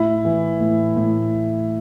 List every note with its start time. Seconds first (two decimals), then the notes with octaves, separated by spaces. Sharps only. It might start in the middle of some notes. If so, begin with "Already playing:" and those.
Already playing: A2 E4
0.25 E3
0.60 A2
0.96 A2